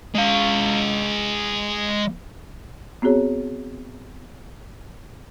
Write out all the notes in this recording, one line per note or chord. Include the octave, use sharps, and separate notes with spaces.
G#3 F5
B3 C4 F#4 G#4 C#5